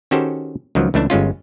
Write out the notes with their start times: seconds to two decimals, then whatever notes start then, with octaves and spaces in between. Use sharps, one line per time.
0.11 D#3 C#4 F#4 G4 A4 C5
0.75 C#2 D#3 F3 F#3
0.94 C#2 E3 A3 D4 E5
1.10 G1 G#3 C#4 F4